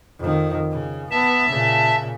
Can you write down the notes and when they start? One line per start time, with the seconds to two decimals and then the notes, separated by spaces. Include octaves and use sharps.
0.19 F2 D#3
0.71 C#3
1.11 B3 E5 A5
1.49 A#2 C#3